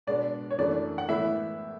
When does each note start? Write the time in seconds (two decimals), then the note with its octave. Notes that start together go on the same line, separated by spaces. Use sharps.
0.07 B2 G#3 B3 D4 D5
0.51 C#5
0.58 F#2 E3 A3 D4 D5
0.98 F#5
1.09 A2 E3 G#3 B3 E4 E5